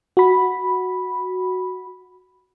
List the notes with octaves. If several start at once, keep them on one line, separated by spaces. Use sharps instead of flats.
F#4 B5